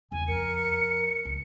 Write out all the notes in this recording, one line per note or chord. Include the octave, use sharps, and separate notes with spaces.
E2 C#3 G#5
F2 A#4 C#7
G1 C#2